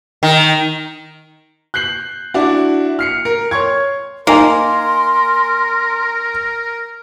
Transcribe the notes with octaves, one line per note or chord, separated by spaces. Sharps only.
D#3
F#6 G6 C7 F#7
D4 E4 F#4
F6 C7 C#7
A#4
C#5 C6 C#6 G#6
A#3 D#4 A#4 G#5 C6